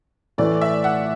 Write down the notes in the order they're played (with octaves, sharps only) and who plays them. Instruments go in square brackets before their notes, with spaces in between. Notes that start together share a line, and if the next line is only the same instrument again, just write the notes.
[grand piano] A2 E3 A3 [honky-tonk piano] D5
[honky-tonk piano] E5
F#5